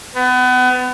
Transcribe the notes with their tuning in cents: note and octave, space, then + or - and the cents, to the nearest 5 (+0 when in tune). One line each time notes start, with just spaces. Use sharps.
B3 +30